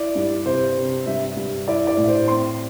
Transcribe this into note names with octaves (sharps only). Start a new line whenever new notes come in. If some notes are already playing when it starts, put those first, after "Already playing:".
Already playing: E4 D5
G2
C3 C5
C3
G2 E5
G2
E4 D5
D5
A2
C5
C4 C6